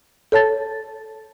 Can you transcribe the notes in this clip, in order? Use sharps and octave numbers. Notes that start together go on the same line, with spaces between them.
A4 C#5 A5 A6